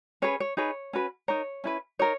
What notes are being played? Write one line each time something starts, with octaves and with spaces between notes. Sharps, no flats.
C#4 G#4 B4 C#5
C#5
D#4 G#4 B4 C#5
C#4 F#4 B4
D#4 A#4 C#5
C#4 E4 B4
D#4 A#4 C#5